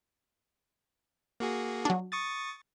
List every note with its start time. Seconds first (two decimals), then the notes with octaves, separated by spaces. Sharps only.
1.40 A#3 F#4 G#4
1.85 F#3 D4
2.12 C#6 D#6 A6